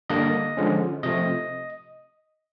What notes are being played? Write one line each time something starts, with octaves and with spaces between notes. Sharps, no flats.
D3 G3 A#3 D4 D#5
D3 F3 G#3 C#4
C3 F3 A3 D#5